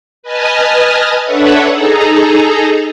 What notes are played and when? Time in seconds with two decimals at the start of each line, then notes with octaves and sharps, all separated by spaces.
0.23 B4 D#5 G#5 A5 D#6 F6
1.25 D4 A4 B4 C#5 E5 F#5
1.71 D#4 G#4 A4 A#5